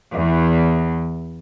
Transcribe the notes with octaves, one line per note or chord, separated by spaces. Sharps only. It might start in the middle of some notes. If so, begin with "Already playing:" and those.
E2